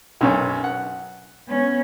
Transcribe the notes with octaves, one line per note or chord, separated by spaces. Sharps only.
B1 F#2 C#4
F#5
B3 C#4